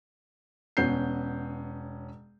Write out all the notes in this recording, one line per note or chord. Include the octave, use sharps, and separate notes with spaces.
E1 B3 C#4 G6 C7